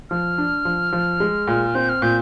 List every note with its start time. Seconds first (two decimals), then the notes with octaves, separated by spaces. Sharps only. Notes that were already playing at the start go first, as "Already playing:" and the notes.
0.10 F3 F6
0.38 D4
0.65 F3
0.92 F3
1.20 G#3
1.47 A#2
1.75 C4 G6
1.89 F6
2.02 A#2 G6